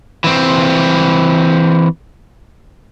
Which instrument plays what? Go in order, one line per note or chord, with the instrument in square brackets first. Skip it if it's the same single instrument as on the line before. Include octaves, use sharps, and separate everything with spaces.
[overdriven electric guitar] E3 C4